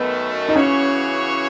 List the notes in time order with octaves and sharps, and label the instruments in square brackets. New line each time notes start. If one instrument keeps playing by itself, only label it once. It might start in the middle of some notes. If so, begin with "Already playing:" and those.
Already playing: [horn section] F#2 D#3 A3 [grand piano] B3
[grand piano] D#4
[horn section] C#3 E3 B3 F#4 C#5 [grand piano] C#4